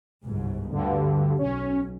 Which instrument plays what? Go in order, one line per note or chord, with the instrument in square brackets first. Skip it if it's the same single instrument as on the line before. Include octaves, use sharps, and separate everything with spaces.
[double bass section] G1 C2 G#2
[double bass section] D2 [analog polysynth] G2 D3
[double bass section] B1 [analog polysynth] C#4